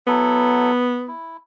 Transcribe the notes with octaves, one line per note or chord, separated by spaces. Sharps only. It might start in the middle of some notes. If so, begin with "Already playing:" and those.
F#3 B3 E4 A4
E4